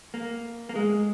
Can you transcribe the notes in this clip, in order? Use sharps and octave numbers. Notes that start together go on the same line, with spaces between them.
A#3
A#3
G#3